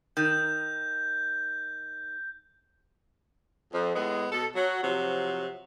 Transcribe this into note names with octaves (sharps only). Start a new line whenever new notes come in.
D#3 G6
F2
A2 G#3 B3
B2 A4
F#3
C3 F3 F#3